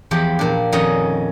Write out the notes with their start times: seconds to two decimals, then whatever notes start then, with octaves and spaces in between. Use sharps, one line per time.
0.11 E2 F3 G4 B5
0.39 A#2 D4
0.72 F2 D#3 C#4 C#5 D#5 F#5